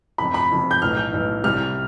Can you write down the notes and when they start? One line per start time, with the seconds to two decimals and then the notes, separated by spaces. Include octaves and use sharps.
0.18 F1 F2 C3 B5
0.34 B5
0.50 F1 F2 C3
0.71 G6
0.81 B1 A2 E3 F6
0.97 G6
1.12 B1 A2 E3
1.44 C2 C3 G3 F6